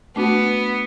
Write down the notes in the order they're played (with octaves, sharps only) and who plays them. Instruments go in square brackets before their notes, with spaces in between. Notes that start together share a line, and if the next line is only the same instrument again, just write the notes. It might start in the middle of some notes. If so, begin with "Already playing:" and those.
[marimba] A3 D4 F#4 [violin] B3